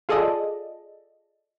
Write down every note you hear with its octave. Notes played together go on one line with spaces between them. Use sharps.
F4 G#4 A4 D5 D#5